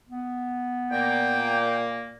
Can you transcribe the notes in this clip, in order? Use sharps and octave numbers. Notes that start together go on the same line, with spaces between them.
B3
A#2 A#3 G5